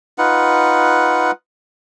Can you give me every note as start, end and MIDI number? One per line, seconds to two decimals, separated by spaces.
0.18 1.31 63
0.18 1.31 65
0.18 1.31 71
0.18 1.31 78